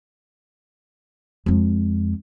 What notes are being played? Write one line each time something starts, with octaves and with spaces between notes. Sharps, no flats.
F2 G#3